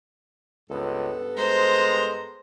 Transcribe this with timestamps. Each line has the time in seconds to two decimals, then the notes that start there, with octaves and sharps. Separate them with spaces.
0.70 C#2 G2 B3 A4
1.37 G#3 C5 A#5